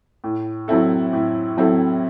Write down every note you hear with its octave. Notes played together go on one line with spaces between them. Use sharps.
A2
F#3 C4 E4 A4
A2
F#3 C4 E4 A4